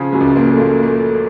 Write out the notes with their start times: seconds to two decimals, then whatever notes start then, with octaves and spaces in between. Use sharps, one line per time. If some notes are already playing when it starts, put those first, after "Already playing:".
Already playing: C#3 F3
0.12 F#2 F#3
0.20 C#2
0.35 A#2 A#3
0.52 A3
0.59 A#2 A#3
0.83 A3